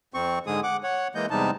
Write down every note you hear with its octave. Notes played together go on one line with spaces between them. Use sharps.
F2 C4 C#6
G#2 D3 G#3 G#4 D#6
F#5 D6
C#5 F#5
E3 G#3 A#3 D#5 G6
E2 C3 G3 G#3 D#4 A5